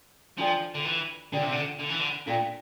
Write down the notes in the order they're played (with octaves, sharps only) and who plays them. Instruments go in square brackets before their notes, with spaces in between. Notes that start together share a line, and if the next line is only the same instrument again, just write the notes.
[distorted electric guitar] F3 [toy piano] D4 F4 A4 D5 G5
[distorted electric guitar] D3
E3
[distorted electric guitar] D3 [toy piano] D4 F4 A4 D5 G5
[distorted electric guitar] C3
D3
D3
E3
D3
[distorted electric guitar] A#2 [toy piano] D4 F4 A4 D5 G5